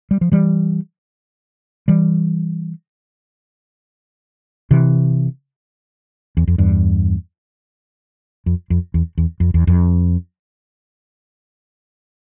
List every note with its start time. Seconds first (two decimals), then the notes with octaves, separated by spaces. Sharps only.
0.11 G3
0.21 F3
0.32 E3 G3
1.88 E3 G3
4.71 C3 E3
6.37 E2
6.48 F2
6.58 E2 G2
8.46 F2
8.70 F2
8.94 E2
9.18 E2
9.40 F2
9.54 E2
9.67 F2